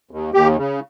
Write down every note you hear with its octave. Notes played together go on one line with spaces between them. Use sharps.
D#2
D#2 G4
C#3